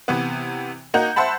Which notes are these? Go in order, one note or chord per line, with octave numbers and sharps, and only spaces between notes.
C3 E3 B3
A#3 D#4 F#4 G6
C5 E5 F#5 A5 B5